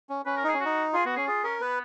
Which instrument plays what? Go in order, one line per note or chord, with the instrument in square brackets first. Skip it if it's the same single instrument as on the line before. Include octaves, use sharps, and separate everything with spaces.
[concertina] C#4
[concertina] C#4 [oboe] B4
[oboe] A#4
[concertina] D#4
[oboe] G#4
[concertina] C#4
[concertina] D#4 [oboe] F#4
[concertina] F4 [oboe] G#4
[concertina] B3 [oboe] F#4
[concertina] C#4 [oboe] G#4
[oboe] F4 [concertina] G#4
[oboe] C#4 [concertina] A#4
[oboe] B3 [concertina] B4